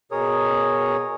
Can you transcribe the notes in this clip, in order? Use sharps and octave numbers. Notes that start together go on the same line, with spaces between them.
B2 G#4 A#4 C#5 D#6